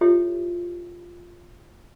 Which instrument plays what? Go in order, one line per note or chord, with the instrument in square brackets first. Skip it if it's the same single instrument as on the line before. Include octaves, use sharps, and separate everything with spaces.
[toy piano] E4 F4 G4 A4 C#5 E5